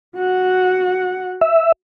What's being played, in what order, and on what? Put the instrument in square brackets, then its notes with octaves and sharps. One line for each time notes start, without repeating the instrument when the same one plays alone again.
[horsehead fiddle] F#4 F#5
[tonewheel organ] E5